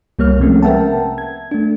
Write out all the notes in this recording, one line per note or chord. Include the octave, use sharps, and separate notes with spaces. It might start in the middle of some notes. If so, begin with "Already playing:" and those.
C2 G3 A#3 C#5 F6
C3 F3 G#3 A3 C4 C#4
A#4 B4 E5 F#5 G5 A5
G#6
A3 D4